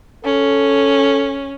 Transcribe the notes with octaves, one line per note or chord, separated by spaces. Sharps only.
C#4 A4